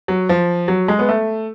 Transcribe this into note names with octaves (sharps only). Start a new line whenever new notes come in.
F#3
F3
F#3
G#3
B3
A3